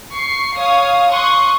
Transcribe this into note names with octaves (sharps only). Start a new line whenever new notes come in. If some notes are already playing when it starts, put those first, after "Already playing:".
C#6 C7
C#5 F5 D#6
C6 C#6 D#6 F#6